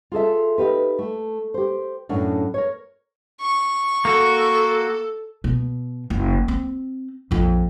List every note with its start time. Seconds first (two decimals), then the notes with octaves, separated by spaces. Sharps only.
0.12 F4 G#4 A4 E5
0.58 D#4 F4 G4 B4
0.99 A3
1.54 G4 C5
2.09 F#2 A2 C#4 D4
2.54 A#4 C#5
3.41 C#6
4.05 A#3 F#4 A4
5.44 B2
6.10 F#1
6.48 C4
7.31 A#1 F2